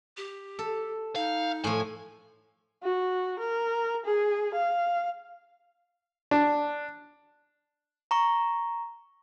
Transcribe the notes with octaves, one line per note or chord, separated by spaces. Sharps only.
G4
A4
D#4 F5
A2 F3 G#5
F#4
A#4
G#4
F5
D4
A#5 C#6